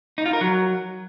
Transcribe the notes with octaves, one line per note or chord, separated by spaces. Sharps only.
D#4
F4
A#4
F#3